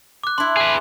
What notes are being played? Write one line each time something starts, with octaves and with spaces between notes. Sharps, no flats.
D6 F#6
D4 E4 C6
G#4 B4